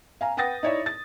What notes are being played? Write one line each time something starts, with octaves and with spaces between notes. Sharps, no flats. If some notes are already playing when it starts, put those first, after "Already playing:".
F5 G#5 A#5
B4 F#5 G5 D#6 A6 A#6
D#4 E4 C#5 D5 E5
A6